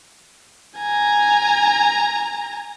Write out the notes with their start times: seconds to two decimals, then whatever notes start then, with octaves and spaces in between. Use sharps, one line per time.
0.78 G#5 A#5